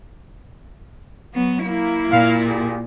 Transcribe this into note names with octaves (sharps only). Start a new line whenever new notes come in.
F#3 B3
A#3 E4
A#2 F5
F4 G4 G#4